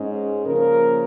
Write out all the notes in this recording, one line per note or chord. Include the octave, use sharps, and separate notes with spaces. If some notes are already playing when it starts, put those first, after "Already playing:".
Already playing: G#2 G#3 C#4
C#3 F3 A#3 A#4